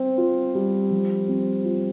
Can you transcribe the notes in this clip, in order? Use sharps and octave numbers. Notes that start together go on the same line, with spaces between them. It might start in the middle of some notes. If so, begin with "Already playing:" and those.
Already playing: C4 C5
F4
G3
F3
C4
F4